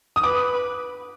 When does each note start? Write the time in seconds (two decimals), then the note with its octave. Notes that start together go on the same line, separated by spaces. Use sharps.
0.16 D#6
0.24 B4 D6